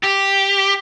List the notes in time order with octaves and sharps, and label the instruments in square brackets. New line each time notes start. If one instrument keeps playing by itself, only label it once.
[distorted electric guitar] G4